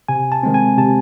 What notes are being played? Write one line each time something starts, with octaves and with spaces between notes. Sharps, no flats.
C3 G#5
A5
D#3 G#3 C4
G#5
C3 A5